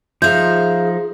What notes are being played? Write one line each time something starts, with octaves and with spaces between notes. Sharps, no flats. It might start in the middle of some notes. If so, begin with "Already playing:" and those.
F3 D#4 G#4 E5 F5 G6